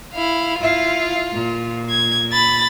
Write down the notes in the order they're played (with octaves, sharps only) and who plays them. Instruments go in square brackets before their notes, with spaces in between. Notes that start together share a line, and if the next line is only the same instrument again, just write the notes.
[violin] E4 F5
[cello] E4 F5 [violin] F4
[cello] A#2
[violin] G#6
B5 A6